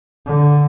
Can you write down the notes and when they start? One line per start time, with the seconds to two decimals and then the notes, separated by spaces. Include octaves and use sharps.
0.26 D3